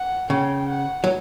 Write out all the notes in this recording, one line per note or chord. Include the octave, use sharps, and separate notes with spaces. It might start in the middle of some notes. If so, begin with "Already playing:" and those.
Already playing: F#5
C#3 G5
F#5
F#3